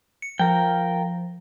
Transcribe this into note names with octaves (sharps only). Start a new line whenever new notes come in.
C#7
F3 F4 A#4 G5